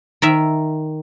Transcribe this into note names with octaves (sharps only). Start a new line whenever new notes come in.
D#3 A#4 E5